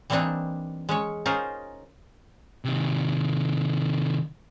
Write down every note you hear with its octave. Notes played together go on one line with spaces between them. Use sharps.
E3 G3 A#3 C4 D4 D#4
G#3 C#4 C#5
C#4 D#4 F4 G#4 A#4 C5
C3 D#3